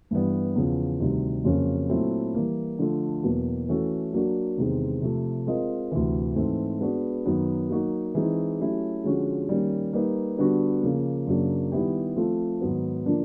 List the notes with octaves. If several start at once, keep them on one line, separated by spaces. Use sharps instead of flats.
G2 E3 G3 B3
E2 C#3 F3
D2 C3 D#3 G3
F2 C#3 F#3 A#3 C#4
A#2 F#3 A3 C4 E4
E3 G3 A#3
D3 F3 A3
E2 B2 F#3 A#3
E3 A3 C#4 F#4 A4
F#3 A#3 D4 F#4
E2 C3 D#3 G#3 C4
C3 F3 A3
G#3 C4 F4 A#4 D#5
D2 C3 E3
G#2 E3 A3 C4
G#3 B3 D4 F#4 B4
F#2 D#3 F#3 B3 D#4
F#3 A#3 D#4 F#4
E3 G#3 C4 D#4
F#3 A3 C#4 E4 G4
D3 F3 G#3 C#4 F#4
D#3 G3 A#3 C#4
G3 A#3 D#4 G4 B4
D3 G3 B3 D4 F#4
C#3 F3 A#3
F#2 C#3 F#3 A#3 D4
D#3 G3 B3 E4 G4
F3 A3 C4 F4
G#2 D#3 F#3 B3
D3 F3 A#3 D4